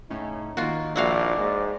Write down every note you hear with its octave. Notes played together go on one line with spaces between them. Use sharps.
A2 C#3 C#4 D#4
D#3 A#3 F4 F#4
A#1 E4 F#4 D5 F5
G#2